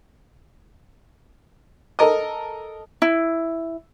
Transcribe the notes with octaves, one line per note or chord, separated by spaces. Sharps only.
A4 A#4 D#5
E4